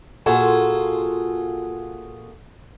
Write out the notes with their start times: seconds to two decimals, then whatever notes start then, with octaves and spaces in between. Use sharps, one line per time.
0.26 A#2 F4 F#4 G#4 A4